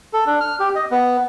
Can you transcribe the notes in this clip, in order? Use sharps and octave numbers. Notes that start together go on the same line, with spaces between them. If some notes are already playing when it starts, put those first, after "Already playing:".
A4
D4
F6
G4
D#5
B3